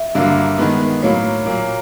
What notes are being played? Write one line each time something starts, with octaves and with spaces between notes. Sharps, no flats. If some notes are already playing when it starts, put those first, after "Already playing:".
Already playing: E5
G2 D3 F#3 A#3
D#3 G#3 B3
A2 F#3 A#3 C#5
A#2 F#3 A#3